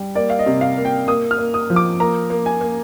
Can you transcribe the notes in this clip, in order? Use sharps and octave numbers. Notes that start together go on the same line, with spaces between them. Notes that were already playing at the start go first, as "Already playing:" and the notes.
Already playing: G3
A#3 D5
F5
D#5
C3
F5
A#3
G5
A#3 D#6
F6
A#3
D#6
F3
D6
A#3 A#5
A#3
G#5
A#3